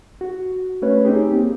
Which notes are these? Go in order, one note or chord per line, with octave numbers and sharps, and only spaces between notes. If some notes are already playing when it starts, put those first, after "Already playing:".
F#4
A3 C#4 B4 C#5
C4 D#4 G4 G#4
A#3